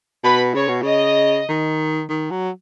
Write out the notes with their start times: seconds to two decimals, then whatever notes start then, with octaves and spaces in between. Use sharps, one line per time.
0.24 B2 B4 B5
0.54 C#3 C#5
0.68 B2
0.82 C#3 D#5
1.49 D#3
2.10 D#3
2.31 F#3